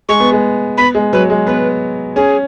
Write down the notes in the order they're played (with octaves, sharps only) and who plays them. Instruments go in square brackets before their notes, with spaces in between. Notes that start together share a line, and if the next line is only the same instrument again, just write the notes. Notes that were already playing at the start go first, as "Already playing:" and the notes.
[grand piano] G#3 [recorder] C#6
[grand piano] B3
G#3
[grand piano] B3 [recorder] B5
[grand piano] G#3
[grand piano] F#3 [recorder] B4
[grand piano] G#3
[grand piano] B3 [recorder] B4
[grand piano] C#4 [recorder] G#4